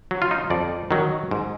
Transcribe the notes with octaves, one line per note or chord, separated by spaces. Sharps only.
F#3
F4
D#4
F2 D5
D#3 F#3
G#2